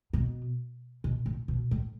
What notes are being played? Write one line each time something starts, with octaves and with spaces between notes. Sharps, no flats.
B2
B2
A2
B2
A2